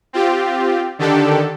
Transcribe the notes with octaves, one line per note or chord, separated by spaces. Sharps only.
C4 F4 G4
D3 D#3 D4 G4 A4